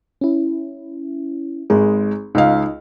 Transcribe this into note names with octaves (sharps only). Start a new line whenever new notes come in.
C#4 E4
G#1 G#3 G#4
C#2 D#4 D#5 F5